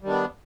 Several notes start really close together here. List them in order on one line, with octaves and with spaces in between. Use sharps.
G3 D#3 D4 B3